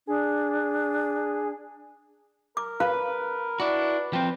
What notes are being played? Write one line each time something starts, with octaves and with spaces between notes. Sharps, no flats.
D4 G#4
A#4 D6
B4 F5
D4 E4 F#4
F3 C4 G5